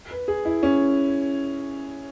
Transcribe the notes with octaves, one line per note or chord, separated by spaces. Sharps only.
B4
G#4
E4
C#4